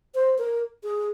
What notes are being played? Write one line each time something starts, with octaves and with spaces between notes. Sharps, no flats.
C5
A#4
G#4